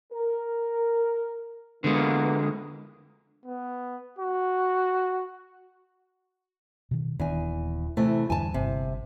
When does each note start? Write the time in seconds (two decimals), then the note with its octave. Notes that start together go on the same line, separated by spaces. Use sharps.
0.13 A#4
1.84 D3 E3 G#3 A#3 B3
3.46 B3
4.19 F#4
6.91 B2 D#3
7.19 D#1 E2 D#3 D4 G#5
7.97 C3 E3 A3
8.30 E2 G2 D3 G#5 A5
8.54 G1 C3